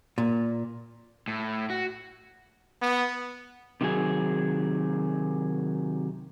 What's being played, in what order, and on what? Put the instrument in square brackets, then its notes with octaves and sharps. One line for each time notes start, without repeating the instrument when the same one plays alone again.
[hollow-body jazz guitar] A#2
[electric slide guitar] A2
F#4
[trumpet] B3
[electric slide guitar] C3 D#3 F#3 G#4